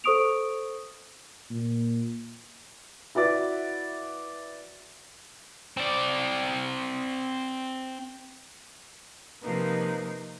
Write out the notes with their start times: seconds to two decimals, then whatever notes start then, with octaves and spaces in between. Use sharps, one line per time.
0.04 A4 C5 C#6 D#6 D7 F7
1.51 A#2
3.15 E4 F#4 B4 D5 E5
5.77 C4 D5
9.43 C3 F3 A#3 D#4 A#4 B4